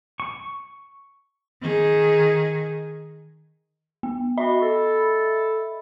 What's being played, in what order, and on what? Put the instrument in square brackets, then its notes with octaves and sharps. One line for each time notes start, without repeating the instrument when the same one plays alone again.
[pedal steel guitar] C#6
[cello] D#3 G#4
[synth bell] B3
[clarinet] F#4 [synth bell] D#5 E5 B5
[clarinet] A4